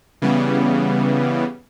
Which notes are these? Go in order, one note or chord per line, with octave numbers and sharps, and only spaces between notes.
C#3 E3 G3 B3